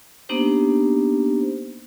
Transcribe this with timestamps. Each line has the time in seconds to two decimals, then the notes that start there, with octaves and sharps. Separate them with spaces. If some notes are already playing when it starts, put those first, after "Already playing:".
0.29 A#3 B3 D4 D#4 G4 C5